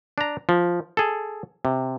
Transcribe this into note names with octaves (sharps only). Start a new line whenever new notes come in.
D4 A#5
F3
G#4 A4
C3